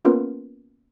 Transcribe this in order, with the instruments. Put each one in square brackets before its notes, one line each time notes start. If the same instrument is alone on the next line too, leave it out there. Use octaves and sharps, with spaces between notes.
[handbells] A#3 B3 C#4 F4 A#4 B4